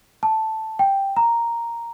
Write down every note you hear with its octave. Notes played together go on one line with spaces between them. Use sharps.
A5
G5
A#5